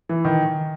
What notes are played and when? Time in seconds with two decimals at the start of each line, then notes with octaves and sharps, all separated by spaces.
0.09 E3
0.25 D#3